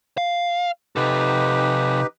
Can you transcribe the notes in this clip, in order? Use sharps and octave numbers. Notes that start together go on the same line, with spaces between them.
F5
C3 D#4 G4 A4 B4